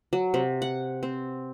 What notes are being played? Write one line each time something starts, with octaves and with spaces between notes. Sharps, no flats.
F#3
C3
F#5
C4